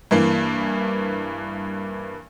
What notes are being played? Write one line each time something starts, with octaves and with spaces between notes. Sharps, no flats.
G2 E3 A#3